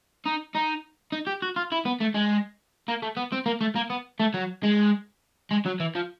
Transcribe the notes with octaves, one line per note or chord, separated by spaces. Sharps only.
D#4
D#4
D#4
G4
F#4
F4
E4
B3
A3
G#3
A#3
A3
B3
C4
A#3
A3
A#3
B3
A3
F#3
G#3
G#3
F#3
E3
F3